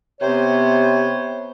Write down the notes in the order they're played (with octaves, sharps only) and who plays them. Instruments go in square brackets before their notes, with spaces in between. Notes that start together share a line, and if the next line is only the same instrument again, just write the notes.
[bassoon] C3 [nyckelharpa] B3 C5 [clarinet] C#5